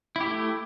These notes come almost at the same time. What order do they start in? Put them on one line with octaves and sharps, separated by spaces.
E4 G4 A3